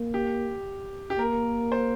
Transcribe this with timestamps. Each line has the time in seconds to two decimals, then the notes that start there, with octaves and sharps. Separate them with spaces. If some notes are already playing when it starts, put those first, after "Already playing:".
Already playing: A#3
0.14 G4
1.10 G4
1.18 A#3 A#4
1.72 C5